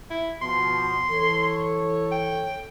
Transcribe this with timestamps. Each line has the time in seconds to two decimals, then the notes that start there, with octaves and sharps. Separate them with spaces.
0.10 E4
0.42 B2 F3 C6
1.11 E3 A4 C#5
2.12 G5